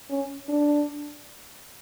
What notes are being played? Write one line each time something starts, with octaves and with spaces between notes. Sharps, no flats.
C#4
D4